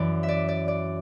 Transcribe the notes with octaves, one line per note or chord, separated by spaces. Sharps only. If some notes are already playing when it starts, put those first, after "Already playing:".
Already playing: F#2 E3 D5
E5
D5
D5
D5